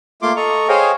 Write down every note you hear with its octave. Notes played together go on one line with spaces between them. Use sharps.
A3 A#3 F4 C6 D6
A4 D#5 A#5 C#6
G#4 C5 C#5 D#5 F5 G5